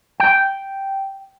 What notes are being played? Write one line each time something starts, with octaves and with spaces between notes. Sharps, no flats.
G5